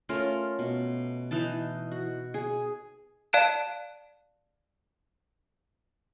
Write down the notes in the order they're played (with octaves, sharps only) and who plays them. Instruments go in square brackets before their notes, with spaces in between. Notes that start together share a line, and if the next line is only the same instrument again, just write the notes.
[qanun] A3 C#4 F4 A#4
B2
E3 D#4 A5
F#4
G#4
[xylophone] D5 F5 A5 F#6 D7 E7